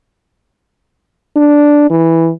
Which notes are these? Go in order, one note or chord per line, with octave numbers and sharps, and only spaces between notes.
D4
E3